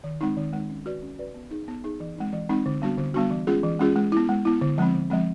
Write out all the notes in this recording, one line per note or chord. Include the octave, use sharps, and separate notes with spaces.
D#3
G#3 C4 D#4
D#3
G#3 C4 D#4
C#4
F#4 B4 D5
C#4
F#4 B4 D5
B3
D#4 G#4
B3
D#4 G#4
E3
G#3 C4 D#4
E3
G#3 C4 D#4
D3
G3 B3 D4 F#4
D3
G3 B3 D4 F#4
E3
G#3 C#4 F4 G#4
E3
G#3 C#4 F4 G#4
G#3
B3 E4
G#3
B3 E4
D3
F3 G#3 C4
D3
F3 G#3 C4